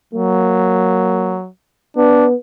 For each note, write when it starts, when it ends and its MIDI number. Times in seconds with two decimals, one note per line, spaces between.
0.13 1.49 54
0.13 1.39 58
1.97 2.34 59
1.97 2.26 62